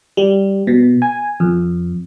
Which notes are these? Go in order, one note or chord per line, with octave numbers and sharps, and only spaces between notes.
G3
B2
G#5
F2